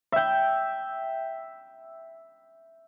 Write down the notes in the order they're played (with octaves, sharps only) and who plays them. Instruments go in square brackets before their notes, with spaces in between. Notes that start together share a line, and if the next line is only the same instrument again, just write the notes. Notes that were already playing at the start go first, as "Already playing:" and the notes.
[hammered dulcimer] E5 G5